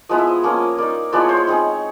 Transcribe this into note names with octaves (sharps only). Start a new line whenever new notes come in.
F3 G#3 B3 E4 D#5
E5
D#5
F3 A#3 C#4
A#3 D#4 D5
F3 G#3 B3 E4 D5
C#5
C5
C#5
G#3 C4 D#4